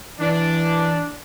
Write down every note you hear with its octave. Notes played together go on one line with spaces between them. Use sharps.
E3 D4